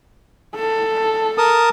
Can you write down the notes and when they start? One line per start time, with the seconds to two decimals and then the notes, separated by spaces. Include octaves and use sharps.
0.55 A4
1.38 A#4 A5 D#6